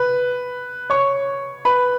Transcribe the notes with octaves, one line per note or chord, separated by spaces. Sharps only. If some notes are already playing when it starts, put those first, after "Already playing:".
Already playing: B4
C#5 C#6
B4 B5